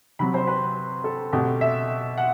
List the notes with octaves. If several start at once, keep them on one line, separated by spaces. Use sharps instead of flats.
C3 F#3 C4 B5
C5
B4
A4
B2 A3 C4 G4
E5
F#5